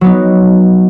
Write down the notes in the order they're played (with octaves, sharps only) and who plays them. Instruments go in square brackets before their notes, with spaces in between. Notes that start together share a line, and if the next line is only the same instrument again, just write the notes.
[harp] F#3 B3 D#4